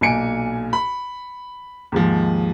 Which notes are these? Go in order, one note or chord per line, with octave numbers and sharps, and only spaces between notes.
B1 A#2 G#5 C#7 D7
B5
D#2 G#2 F3